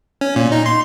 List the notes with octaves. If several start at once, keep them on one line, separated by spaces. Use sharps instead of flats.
C#4
A#2
D#4
C6